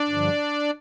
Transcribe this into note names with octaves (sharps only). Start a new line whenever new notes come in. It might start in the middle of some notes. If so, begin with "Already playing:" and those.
Already playing: D4 D5
G2 D3 F3